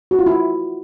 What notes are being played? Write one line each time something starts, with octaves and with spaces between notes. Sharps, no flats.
F#4
F4
E4